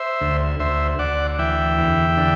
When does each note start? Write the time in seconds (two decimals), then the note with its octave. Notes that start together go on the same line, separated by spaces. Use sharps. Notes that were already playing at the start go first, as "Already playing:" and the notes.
Already playing: C5 E5
0.21 D2
0.60 D2 C5 E5
0.99 D2 D5 F#5
1.39 E3 E5 G5
1.78 E2
2.17 D3